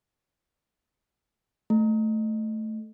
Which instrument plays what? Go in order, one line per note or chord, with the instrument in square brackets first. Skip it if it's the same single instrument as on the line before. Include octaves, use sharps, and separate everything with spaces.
[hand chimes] A3